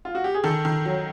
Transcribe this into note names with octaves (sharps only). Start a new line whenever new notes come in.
F4
F#4
G4
G#4
D#3 A4
D#3
F#3